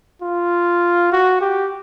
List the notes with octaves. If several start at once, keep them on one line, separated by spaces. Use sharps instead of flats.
F4
F#4
G4